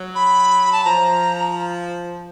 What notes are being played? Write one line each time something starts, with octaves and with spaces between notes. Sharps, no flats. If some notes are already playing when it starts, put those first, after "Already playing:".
Already playing: F#3
B5
A5
F3 A#5